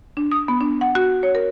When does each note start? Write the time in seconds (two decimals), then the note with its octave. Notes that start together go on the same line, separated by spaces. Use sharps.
0.17 D4
0.32 D#6
0.48 B3
0.61 D4
0.81 F#5
0.95 F#4
1.23 C#5
1.35 A#4